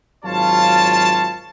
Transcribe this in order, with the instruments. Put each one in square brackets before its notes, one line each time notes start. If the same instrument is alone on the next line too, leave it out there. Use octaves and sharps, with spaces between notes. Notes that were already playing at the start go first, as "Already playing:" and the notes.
[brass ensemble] G#1 F#3 F4 C#5 F5 A5